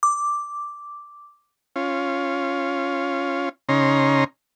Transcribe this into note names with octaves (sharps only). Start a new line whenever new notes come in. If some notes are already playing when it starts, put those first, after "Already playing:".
D6
C#4 F4
C#3 C#4 D#4 A#5 C6